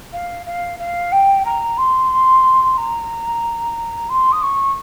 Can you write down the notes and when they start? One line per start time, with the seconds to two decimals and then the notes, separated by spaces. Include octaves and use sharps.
0.13 F5
0.46 F5
0.79 F5
1.12 G5
1.45 A#5
1.78 C6
2.78 A#5
4.09 C6
4.32 D#6
4.43 C#6